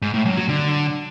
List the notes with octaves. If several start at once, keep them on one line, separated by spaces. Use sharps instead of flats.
G#2
A2
F#2
F#3
D3